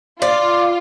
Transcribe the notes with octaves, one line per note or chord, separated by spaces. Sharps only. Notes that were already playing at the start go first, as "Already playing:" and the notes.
F4 D5